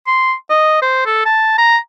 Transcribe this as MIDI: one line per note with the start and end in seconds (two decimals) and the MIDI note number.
0.07 0.33 84
0.50 0.79 75
0.82 1.01 72
1.06 1.23 69
1.26 1.57 81
1.58 1.77 82